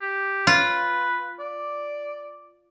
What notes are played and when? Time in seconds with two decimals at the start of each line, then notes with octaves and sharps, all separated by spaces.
0.01 G4
0.47 F4 B4
1.39 D5